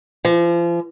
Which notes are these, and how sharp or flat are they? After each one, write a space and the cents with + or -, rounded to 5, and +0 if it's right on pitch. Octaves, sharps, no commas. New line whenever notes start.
F3 -35